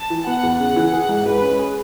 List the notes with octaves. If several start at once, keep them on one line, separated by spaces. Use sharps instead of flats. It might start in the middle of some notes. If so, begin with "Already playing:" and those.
Already playing: A5
E3
B3 F#5
E2
C#3
E3
G#4
G#2
G#3 B4
C#4
G#4